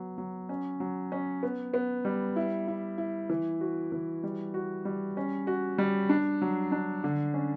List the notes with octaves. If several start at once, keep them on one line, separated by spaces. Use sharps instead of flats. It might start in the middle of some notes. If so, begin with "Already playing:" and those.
Already playing: F#3 B3
F#3
C#4
F#3
C#4
B3
B3
G3
E4
E4
E4
E3
F#4
E3
G3
F#4
G3
C#4
F#4
G3
D4
F#3
D4
D3
C#4